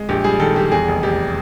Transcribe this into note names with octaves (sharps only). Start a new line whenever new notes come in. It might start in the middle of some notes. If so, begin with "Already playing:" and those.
Already playing: G#3
A#1 G4
G3 G#4
D#3 A4
G3 G4
E2 G#4
F1
F1 G4